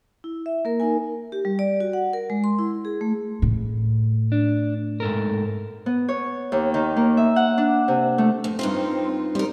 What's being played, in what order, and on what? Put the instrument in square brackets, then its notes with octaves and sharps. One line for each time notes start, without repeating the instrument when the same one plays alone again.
[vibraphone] E4
E5
A#3 A#4
D#4 A#4 G#5
G4
G3
D5
F#4
F#5
A#4
G#3
C6
E4
G#4
A3
[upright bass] A2
[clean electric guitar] D4
G#2 A4 A#4
[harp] B3
C#5
D#2
D#3
A#3
E5
F#5
D4
C3
A3
[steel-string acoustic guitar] F2
[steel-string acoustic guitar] G2 D#4 F4 [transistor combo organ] C4
[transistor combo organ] G3 C4 [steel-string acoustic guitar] D#4 A#4